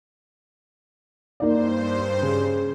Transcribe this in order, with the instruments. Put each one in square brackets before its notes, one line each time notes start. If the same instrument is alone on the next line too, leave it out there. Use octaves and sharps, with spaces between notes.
[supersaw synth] G2 C5 [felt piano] A#3 D#4 D5
[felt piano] C#3